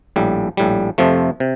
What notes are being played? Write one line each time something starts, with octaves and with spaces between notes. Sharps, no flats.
A#1 A2 G3
A#1 A2 G3
F2 C3 F3 A3
C3